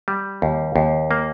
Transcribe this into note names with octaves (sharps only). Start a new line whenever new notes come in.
G3
D#2
D#2
A#3